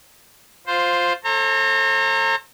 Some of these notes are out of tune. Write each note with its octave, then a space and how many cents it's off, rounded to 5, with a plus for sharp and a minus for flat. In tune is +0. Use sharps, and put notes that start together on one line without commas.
F4 +10 C5 +0
A4 +0 C5 +45 A#5 -30